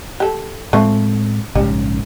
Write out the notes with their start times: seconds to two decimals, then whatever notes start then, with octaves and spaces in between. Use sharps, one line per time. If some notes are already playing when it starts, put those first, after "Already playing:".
0.20 G4 A4
0.73 A2 F3 G#3 A3 C4
1.55 A#1 G#2 C#3 G3